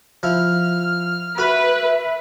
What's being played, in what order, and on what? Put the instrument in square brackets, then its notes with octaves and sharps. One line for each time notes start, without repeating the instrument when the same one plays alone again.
[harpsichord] F3 E4 [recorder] F6
[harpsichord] F#4 B5 [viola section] B4 [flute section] E5